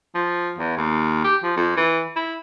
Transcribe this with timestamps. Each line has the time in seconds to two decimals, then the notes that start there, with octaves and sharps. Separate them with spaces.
0.15 F3
0.58 E2
0.77 D#2
1.24 G4
1.43 F3
1.57 F2
1.77 E3
2.16 E4